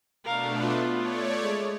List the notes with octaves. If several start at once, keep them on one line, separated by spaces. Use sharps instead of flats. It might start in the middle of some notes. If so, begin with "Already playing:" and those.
B2 A3 D4 A#4 F5
B3 F4
A3 C#5 D5
G#3